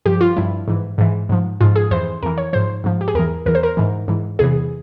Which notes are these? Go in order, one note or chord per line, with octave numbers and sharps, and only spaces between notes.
G2 F3 G4
F4
G2 F3 E4
G#2 E3
G#2 E3
G#2 F3
G#2 F3 F4
G#4
F2 E3 C5
F2 E3 A#4
C#5
G#2 F3 C5
G#2 F3
G4
G#4
E2 E3 A#4
E2 E3 A#4
C5
A#4
G#2 E3
G#2 E3
E2 C3 E3 G#4